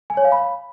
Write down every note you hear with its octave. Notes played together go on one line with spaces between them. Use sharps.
G#5
C#5
F5
B5